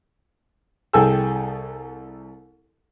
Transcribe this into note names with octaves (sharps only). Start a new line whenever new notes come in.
C2 G#4 A4 G5 G#5 E6